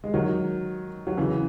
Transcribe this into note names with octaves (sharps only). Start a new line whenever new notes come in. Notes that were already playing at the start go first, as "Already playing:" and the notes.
G#3
D#3 F#3
F#3
C#3 E3